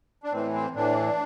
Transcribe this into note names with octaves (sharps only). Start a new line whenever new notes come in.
D4
A2 E3 C4
C4
A2 E3 D4